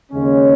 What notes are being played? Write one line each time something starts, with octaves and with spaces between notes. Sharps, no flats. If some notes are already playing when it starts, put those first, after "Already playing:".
D#2 C#3 G#3 C#4